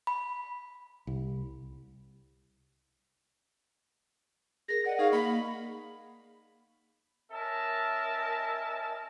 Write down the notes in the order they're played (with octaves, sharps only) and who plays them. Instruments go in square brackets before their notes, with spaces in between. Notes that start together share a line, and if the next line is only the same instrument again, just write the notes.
[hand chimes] B5
[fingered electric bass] C2
[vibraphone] G#4 A#4 [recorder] A#6
[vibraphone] D5 D#5 [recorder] F#5
[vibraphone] D#4 G#4 C#6 [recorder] F5
[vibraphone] A#3 [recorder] B5
[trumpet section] C#4 A#4 D#5 E5 A5